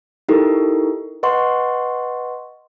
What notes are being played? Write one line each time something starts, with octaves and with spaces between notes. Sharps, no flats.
D#4 E4 G4 A4 A#4
B4 D#5 F#5 C6 C#6